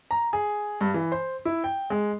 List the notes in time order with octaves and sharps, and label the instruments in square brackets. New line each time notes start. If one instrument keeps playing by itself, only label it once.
[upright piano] A#5
G#4
G2
E3
C5
E4
G5
G#3